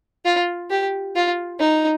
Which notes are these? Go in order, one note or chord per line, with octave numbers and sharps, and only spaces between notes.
F4
G4
F4
D#4